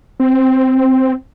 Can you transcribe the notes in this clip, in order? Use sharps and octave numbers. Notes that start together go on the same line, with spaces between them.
C4